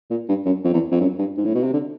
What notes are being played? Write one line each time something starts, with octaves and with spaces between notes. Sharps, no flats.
A#2
G2
F#2
F2
E2
F2
F#2
G2
G#2
A2
B2
C3
D3